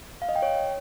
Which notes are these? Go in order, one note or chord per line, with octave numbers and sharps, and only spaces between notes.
F5
D#5
G5
C#5